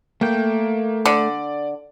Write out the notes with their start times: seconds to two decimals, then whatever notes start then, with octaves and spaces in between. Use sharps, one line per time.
0.21 A3 A#3 G5
1.05 D3 D5